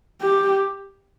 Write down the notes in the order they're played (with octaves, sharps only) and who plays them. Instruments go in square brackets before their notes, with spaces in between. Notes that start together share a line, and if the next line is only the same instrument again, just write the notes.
[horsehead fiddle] G4